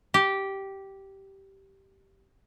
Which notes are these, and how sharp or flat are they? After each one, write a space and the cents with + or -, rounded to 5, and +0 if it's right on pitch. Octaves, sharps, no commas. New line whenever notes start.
G4 -10